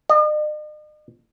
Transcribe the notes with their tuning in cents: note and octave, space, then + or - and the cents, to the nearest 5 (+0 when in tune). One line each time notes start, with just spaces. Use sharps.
D#5 -45